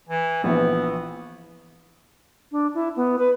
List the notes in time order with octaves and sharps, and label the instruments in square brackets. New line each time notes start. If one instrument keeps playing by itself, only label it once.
[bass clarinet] E3
[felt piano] A#1 E3 [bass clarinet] B3
[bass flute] D4
E4
B3
B4